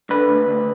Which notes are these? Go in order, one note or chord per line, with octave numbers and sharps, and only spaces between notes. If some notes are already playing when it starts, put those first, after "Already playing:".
D3 B4
D2
D2